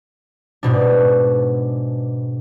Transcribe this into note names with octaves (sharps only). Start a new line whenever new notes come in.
G#2 B2 D4